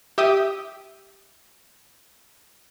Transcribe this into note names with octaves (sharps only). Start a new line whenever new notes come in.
G4 E5 D#6